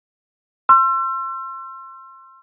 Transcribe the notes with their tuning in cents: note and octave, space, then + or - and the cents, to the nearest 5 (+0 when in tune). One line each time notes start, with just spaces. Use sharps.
C6 +20 E6 +40